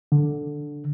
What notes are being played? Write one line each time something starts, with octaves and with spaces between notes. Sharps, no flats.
D3